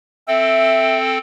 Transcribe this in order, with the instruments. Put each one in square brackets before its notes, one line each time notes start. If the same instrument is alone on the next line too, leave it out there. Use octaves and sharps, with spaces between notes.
[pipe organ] C4 A4 G5 [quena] E5